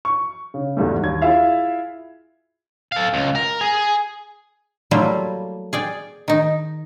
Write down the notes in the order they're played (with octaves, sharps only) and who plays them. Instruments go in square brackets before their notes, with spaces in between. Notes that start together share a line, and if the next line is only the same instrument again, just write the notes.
[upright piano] C#6
C#3
E2 G#2 G3 A3
D#2 G#6
E4 F4 G#4 E5 F5
[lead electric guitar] A4 F5
C#2
A#4
G#4
[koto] F#3 G3 A3 A#3 E4 F4
G#4 D5 G5
D#3 D#4